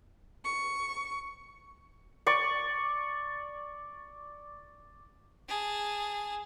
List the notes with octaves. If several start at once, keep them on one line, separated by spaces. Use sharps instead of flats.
C#6
D5 C#6
G#4 A5